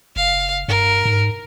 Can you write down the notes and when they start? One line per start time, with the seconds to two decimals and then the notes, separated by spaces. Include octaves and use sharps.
0.16 F#1 F5
0.68 G2 A#4
1.05 G#2